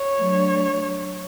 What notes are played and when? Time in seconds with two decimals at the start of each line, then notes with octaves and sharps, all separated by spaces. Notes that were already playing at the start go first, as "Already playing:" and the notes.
Already playing: C#5
0.19 F#3 A3 D4